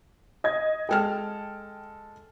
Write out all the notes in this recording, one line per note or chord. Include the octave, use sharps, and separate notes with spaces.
D#5 G#6
G#3 A4 G5 F6